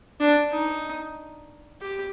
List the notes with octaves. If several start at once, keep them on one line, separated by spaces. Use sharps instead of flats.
D4
D#4
G4